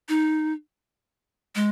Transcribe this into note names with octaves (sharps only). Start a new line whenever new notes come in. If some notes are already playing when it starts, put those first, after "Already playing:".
D#4
G#3